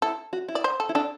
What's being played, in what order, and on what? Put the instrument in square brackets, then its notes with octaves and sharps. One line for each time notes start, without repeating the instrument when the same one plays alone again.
[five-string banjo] E4 [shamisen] A4
[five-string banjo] F#4
E4
[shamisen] D5
C5
A4
[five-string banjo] E4
[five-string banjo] D4 [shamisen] A4